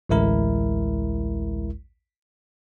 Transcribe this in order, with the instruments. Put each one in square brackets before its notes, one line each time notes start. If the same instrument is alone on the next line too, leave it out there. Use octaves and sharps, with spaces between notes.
[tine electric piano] A1 D2 G#3 E4 A#4